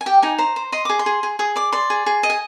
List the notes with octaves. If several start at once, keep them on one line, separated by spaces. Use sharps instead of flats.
G#5
G4 G5
D#4 G#5
C5 A#5
C5
D#5 C6
G#4 D6
C6
G#4
G#4
G#4 D#6
D5 D6
D5 C6
G#4
G#4
D#5
G#5